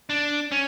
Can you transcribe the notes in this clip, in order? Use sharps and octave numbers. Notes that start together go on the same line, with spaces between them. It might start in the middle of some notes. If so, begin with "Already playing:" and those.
D4
C#4